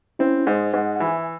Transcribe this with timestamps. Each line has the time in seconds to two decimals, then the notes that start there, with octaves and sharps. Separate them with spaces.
0.19 C4 C#4 E4
0.47 G#2 C5 D#5
0.74 G#2 D#5 F#5
0.96 F#5
1.00 E3 E5 G#5